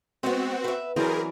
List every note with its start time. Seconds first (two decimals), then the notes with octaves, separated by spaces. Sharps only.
0.23 G#3 B3 C4 F#4
0.64 B4 E5
0.96 E3 F#3 C4 G#4 A#4 D5